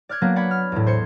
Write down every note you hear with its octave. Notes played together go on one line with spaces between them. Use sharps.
D5 F6 F#6 G#6
F#3 A#3 B3 D4
D5 F#5 B5 G#6
F6
E2 A2
C5 G#6 C#7